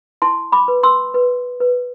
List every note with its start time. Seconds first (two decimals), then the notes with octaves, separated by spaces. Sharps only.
0.22 E4 A5 C6
0.52 B5 D6
0.68 B4
0.83 C6 E6
1.14 B4
1.60 B4